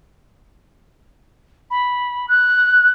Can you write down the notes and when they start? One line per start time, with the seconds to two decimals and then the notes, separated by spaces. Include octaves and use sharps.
1.70 B5
2.28 F#6